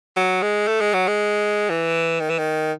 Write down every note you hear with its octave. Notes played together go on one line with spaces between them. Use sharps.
F#3
G#3
A3
G#3
F#3
G#3
E3
D#3
E3
D#3